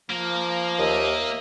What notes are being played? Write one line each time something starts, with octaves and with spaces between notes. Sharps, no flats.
F3 A#3 A#4
D#2 D#5 E5